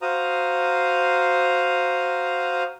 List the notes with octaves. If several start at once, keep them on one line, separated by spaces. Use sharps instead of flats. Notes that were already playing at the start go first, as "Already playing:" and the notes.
F#4 C5 F5 A#5 D#6